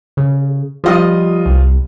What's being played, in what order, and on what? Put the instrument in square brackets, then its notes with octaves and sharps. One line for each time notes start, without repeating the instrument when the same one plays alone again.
[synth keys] C#3
[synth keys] F3 D#5 [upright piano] G3 F4 D#6
[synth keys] C2